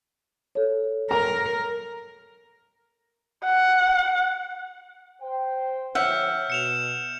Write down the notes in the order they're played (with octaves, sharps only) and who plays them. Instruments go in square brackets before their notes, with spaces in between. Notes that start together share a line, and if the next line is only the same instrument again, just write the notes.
[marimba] A4 C#5
[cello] A#4 [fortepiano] A#5
[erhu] F#5
[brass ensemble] C5 G5
[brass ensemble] D3 F3 C#5 [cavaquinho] E5 F#5 [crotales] F6 G6
[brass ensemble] B2 [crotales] C#7 E7 F7